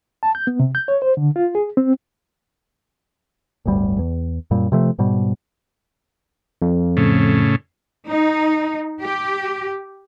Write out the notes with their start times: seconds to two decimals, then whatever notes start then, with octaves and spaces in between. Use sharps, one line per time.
0.23 A5
0.35 G6
0.47 B3
0.60 C3
0.75 G6
0.88 C#5
1.02 C5
1.17 D3
1.36 F4
1.55 G#4
1.77 C4
3.66 D1 G1 D2 G3
3.99 E2
4.51 F#2 A#2 G3
4.72 C3 F3 A3
4.99 G#2 B2 G3
6.62 F2
6.97 A2 C#3
8.08 D#4
9.00 G4